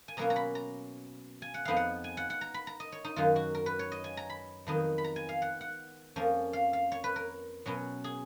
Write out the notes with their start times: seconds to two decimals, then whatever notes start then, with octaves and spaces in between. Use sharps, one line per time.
0.08 G#5
0.17 B2 F#3 A#3 C#4 A#5
0.30 A#5
0.36 B5
0.55 A#5
1.42 G#5
1.54 F#5
1.65 F2 F3 B3 D#4 F5
1.76 F#5
2.04 G#5
2.17 F#5
2.30 F#5
2.41 A#5
2.54 B5
2.67 A#5
2.80 D#5
2.92 C#5
3.04 D#4
3.16 F#2 D#3 F#3 F4
3.36 F#4
3.55 A#4
3.66 B4
3.79 C#5
3.92 D#5
4.04 G#5
4.17 A#5
4.30 B5
4.67 F2 D#3 F#3 B3 D#4
4.98 B5
5.04 A#5
5.16 G#5
5.29 F5
5.42 F#5
5.61 F#5
6.16 F2 F3 A#3 C#4
6.53 F5
6.73 F5
6.92 C#5
7.04 B4
7.16 A#4
7.66 B2 F#3 C#4
8.04 G#4